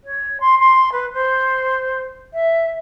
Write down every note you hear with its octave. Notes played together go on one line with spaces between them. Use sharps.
C#5
C6
C6
B4
C5
E5